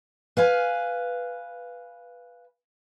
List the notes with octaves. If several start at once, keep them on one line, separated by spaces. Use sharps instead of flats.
B4 F5 G#5